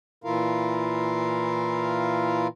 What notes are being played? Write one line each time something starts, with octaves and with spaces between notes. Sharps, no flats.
A#2 E3 E4 F4 A#4 F5